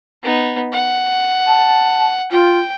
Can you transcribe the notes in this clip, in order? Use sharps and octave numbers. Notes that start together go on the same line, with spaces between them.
B3 D#4
F#5
A5
F4 G5